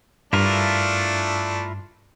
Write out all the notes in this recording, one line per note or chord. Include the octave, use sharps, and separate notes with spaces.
G2 A3 D4 E4 F4 A#4